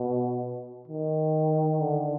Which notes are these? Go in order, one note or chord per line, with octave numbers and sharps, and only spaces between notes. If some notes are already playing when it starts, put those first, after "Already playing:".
Already playing: B2
D#3
D3